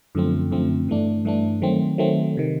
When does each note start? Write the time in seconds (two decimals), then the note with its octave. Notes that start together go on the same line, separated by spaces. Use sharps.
0.15 F#2 D3 F3 A3 C4
0.51 F#2 D3 F3 A3 C4
0.88 G2 E3 A3 D4
1.25 G2 E3 A3 D4
1.62 D#3 F#3 A3 C4
1.98 D#3 F#3 A3 C4
2.37 C3 D#3